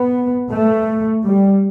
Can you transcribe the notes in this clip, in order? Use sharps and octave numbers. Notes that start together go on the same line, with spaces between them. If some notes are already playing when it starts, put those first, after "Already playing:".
Already playing: B3
A3
G3